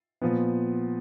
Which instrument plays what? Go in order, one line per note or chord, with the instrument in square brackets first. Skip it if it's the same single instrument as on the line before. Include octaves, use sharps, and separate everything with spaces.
[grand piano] A#2 F3 B3